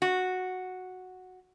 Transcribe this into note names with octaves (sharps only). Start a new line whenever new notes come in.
F#4